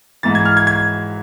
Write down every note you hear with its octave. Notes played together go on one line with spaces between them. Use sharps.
G#2 E3 A6
G#6
F6
G#6
G#6